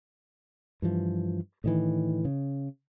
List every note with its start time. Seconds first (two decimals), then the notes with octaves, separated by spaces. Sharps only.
0.82 G2 E3 F3
1.64 A2 D#3 E3
2.25 C#3